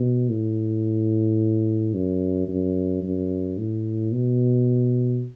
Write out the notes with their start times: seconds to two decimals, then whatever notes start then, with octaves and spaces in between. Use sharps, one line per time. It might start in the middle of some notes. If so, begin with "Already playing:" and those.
Already playing: B2
0.30 A2
1.94 F#2
2.48 F#2
3.03 F#2
3.58 A2
4.12 B2